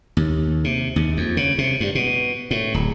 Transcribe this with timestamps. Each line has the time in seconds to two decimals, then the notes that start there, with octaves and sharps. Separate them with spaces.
0.17 D#2
0.64 C3
0.96 D#2
1.17 F2
1.37 C#3
1.58 C3
1.80 G2
1.95 B2
2.51 A2
2.74 D1